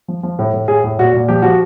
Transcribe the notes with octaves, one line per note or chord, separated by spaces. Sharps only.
F3
F3
A2
A2
A2 G#4
A2
A#2 F#4
A#2
F3 G4
F3 F#4